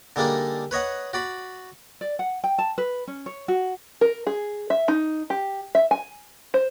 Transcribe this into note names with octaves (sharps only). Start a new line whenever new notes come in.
D3 G3 G#3 A#3 D4 D#4
B4 C#5 D#5 F#5
F#4 D5 B5
D5
F#5
G5
A5
B4
C#4
C#5
F#4
A#4
G#4
E5
D#4
G4
E5
G#5
C5